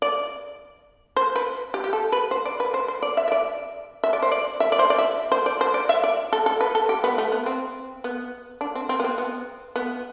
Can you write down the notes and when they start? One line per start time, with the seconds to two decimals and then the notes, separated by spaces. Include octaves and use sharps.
0.02 D5
1.17 C5
1.36 B4
1.74 G4
1.84 G4
1.93 A4
2.12 B4
2.31 C5
2.45 D5
2.60 B4
2.74 C5
2.88 C5
3.02 D5
3.17 E5
3.28 E5
3.32 D5
4.04 E5
4.13 D5
4.22 C5
4.32 D5
4.60 E5
4.72 D5
4.79 C5
4.90 D5
4.98 E5
5.32 C5
5.46 D5
5.61 C5
5.74 D5
5.89 E5
6.04 D5
6.33 A4
6.46 A4
6.61 B4
6.75 A4
6.89 G4
7.04 B3
7.18 A3
7.32 B3
7.46 C4
8.04 B3
8.61 D4
8.75 C4
8.89 C4
9.00 B3
9.04 C4
9.18 B3
9.76 B3